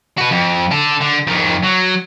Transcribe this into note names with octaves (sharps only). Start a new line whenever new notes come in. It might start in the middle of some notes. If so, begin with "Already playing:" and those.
F#4 B4
F2
D4 A4
D3
F2 D#3
F#3